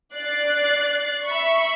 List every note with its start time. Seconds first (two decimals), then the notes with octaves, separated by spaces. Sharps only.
0.14 D5 F#6 A6 C7
1.25 E5 B5 C#6